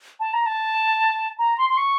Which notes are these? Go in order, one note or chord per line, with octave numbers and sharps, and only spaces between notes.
A5
A#5
A5
A#5
C6
C6
C#6